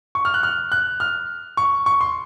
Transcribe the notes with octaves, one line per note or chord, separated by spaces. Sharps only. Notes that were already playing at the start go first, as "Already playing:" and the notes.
C#6
F6
F#6
F6
F#6
F6
C#6
C#6
C6